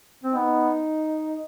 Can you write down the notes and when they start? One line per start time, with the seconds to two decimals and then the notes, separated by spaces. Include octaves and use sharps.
0.24 C4
0.34 B3 D#4